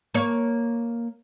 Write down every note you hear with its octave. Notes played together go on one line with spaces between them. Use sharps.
A#3 C#5